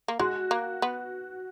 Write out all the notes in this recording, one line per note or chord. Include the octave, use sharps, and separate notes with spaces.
A#3
G#3 F#4
A#3
B3